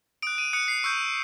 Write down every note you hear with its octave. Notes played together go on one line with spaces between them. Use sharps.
D#6 F#6 D7
D#7
D#6 F#6 C#7
C7
C#6 E6 G6